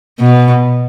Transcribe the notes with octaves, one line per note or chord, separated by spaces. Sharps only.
B2